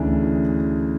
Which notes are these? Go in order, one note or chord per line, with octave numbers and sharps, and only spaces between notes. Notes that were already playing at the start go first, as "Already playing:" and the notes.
Already playing: D2 C#3 E3 D4